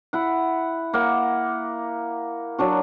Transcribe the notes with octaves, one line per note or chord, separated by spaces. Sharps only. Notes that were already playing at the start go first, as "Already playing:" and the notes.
E4 F#5
A#3 F#5
F#3 D4 F#4